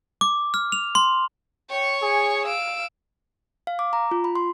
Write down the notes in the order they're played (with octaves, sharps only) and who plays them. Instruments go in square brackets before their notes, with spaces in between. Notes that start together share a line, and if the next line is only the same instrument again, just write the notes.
[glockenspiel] D6
F6
F7
C6
[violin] C#5 C#6 [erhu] G5
[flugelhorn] G#4 [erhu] G#5
[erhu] F5 [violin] E6 D7
[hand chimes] F5
D6
A#5
F4
B5
C6